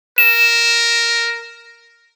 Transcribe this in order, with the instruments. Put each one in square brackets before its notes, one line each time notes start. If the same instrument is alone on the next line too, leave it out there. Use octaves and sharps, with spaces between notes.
[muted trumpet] A#4 [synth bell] E7